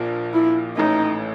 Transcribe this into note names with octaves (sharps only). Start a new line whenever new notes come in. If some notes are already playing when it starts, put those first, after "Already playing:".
Already playing: A#1 A#2 F3 A#3 D4
E4
A1 A2 E3 A3 D#4